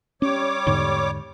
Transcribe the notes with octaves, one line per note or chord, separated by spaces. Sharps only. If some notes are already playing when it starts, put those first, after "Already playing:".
G3 C#4 C#5 D6
E2 G#2 D3